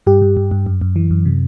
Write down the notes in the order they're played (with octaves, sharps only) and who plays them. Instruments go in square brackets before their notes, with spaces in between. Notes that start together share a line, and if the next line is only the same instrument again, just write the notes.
[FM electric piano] G2 G4
G2
G2
G2
F#2
F#2
E3
F#2
C3